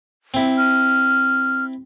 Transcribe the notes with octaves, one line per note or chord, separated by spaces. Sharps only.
C4 E4
F6